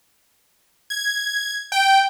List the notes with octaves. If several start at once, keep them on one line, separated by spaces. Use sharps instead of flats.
G#6
G5